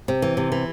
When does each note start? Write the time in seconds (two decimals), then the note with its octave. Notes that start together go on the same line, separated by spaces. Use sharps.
0.08 C3
0.22 E3
0.37 C3
0.52 E3